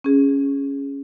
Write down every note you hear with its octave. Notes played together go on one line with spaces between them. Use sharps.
C#4 G#4